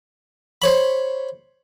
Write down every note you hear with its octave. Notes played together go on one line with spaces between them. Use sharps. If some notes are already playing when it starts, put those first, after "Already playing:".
C5 C#5 B5